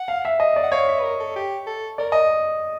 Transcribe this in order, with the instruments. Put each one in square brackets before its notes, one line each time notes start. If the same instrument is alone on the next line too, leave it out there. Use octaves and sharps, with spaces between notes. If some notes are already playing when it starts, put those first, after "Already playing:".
Already playing: [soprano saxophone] F#5
[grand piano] F5
E5
D#5
D5
[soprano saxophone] F#5
[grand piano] C#5 [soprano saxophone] F5
[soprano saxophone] E5
B4
A#4
A4
G4
A4
[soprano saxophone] A#4 [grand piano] D5
[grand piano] D#5